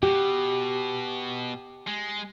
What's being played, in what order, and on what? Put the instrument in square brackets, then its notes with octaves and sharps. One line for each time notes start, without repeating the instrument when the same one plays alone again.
[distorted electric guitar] B2 [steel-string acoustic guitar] G4
[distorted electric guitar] G#3